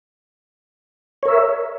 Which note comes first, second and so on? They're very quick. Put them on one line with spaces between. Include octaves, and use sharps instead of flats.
C#5 A#4 E5